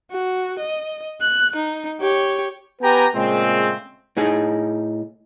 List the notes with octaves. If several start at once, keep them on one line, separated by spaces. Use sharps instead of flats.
F#4
D#5
F#6
D#4
G4 C#5
B3 G4 B4 G5 G#5 A#5
A#2 C#3 G#3 A3 C4
A2 D#4 G#4